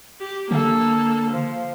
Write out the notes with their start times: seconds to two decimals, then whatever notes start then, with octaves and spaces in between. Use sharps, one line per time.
0.20 G4
0.51 D3 A#3 A4
1.31 F3